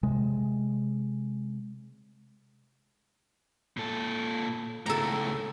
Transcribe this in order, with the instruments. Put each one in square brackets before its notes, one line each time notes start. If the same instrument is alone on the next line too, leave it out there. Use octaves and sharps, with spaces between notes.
[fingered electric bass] C3 G#3
[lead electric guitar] A#2 A4
[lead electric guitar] C#2 A2 [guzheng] A4 A#5